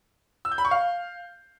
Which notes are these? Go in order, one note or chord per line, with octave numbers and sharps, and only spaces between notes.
E6
G6
B5
C#6
F5